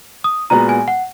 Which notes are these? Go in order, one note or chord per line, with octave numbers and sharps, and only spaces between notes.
D#6
A#2 G#3 B3 F#4 A#5
G#5
F#5